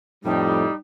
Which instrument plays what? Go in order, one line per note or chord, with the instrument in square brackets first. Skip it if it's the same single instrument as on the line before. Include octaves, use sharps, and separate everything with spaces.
[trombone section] F2 A2 [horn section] G3 [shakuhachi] D#4